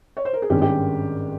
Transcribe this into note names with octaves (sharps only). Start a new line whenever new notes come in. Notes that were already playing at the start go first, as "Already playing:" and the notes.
C#5
C5
A#4
G#4
G#1 G2 D#3 G#3 C#4 G4
G4